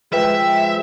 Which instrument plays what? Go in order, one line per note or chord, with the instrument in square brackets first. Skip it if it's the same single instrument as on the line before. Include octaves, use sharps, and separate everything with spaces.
[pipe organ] F3 G#3 [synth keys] B4 G5 [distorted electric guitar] E5